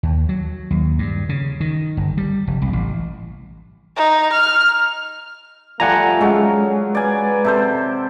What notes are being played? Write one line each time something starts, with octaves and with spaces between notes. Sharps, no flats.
D#2
F#3
D#2
G2
C#3
D#3
G1
G3
F1
C2
A1
D#4
F6
F3 G3 A3 F#5 G#5 A#5
F#3 G#3 C#4
B4 D5 G#5
C3 A4 C5